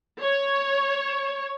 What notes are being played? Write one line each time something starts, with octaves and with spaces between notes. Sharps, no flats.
C#5